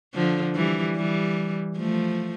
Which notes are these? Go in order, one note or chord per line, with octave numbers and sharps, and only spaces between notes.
D3 F3
E3 G3
E3 G3
F3 A3